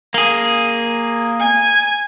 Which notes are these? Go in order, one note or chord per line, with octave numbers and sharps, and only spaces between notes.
A#3 G#4
G#5